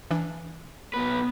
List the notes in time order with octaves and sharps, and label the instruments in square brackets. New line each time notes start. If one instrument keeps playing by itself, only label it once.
[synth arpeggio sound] E3 D4
[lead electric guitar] B1 B4 [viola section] B3